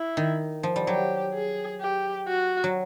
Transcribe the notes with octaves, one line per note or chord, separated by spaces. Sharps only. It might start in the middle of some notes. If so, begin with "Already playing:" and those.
Already playing: E4
D#3
F3
G3
F#3 G4
G#4
G4
F#4
F#3